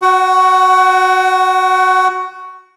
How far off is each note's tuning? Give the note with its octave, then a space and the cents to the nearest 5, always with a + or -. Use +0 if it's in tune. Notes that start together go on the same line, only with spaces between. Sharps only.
F#4 +0 F#5 +30